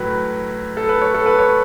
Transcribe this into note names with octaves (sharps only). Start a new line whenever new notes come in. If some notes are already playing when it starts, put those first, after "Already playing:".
Already playing: A2 F#3 B4
A4
B4
C#5
A4
B4
C#5